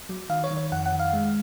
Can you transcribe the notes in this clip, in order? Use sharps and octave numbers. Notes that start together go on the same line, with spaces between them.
F#3
D#3 F5
C#5
D#3
C#5
F2 F#5
F#5
D#3
F5
G#3